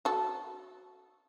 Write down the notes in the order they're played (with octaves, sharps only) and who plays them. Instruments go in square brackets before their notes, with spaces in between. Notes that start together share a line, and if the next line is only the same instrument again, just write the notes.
[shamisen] F#4 A4